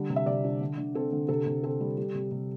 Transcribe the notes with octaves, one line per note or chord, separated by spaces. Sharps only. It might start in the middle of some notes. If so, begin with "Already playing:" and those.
Already playing: D3 G3
C3
E5
C3 D5
D4
D3
D3
C4 A4
D3
C3 A4
C3
C4 A4
G3
G3
C3
C3